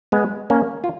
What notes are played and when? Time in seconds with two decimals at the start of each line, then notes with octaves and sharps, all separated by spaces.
0.12 G#3 B3
0.50 A#3 C#4
0.84 F4